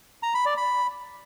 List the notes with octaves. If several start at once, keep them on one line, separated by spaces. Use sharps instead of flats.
A#5
B5
D5
B5